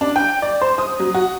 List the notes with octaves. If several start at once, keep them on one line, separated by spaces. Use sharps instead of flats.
D4
G5
D5
C5
D#6
F#3
F#4